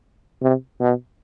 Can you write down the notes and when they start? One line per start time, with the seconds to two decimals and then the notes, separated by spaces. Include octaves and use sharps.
0.42 C3
0.80 B2